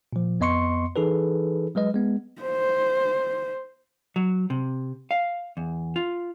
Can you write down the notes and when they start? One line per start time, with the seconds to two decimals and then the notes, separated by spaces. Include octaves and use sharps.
0.13 A#2 F3
0.40 F2 B3 D#5 C6 C#6 C#7
0.96 E3 D#4 G#4 A4 B4
1.75 F#3 G#3 B4 D#5
1.94 G#3 B3
2.42 C5
4.16 F#3
4.50 C3
5.11 F5
5.57 E2
5.96 F4